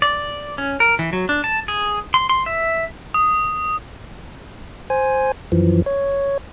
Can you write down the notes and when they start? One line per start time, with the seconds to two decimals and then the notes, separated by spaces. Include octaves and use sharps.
0.02 D5
0.58 C#4
0.80 A#4
0.99 E3
1.13 F#3
1.29 D4
1.44 A5
1.68 G#4
2.14 C6
2.29 C6
2.46 E5
3.14 D#6
4.90 C5 G#5
5.52 F#2 E3 F3
5.86 C#5